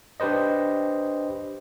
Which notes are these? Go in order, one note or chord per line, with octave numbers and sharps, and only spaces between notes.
D4 G4 B4 C5 D#5